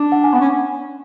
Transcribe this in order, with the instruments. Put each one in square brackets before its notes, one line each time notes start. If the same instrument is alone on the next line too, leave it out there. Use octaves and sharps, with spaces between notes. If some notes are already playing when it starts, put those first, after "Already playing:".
Already playing: [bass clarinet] D4
[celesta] F#5
G#5
[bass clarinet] B3 [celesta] F#5
[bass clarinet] C#4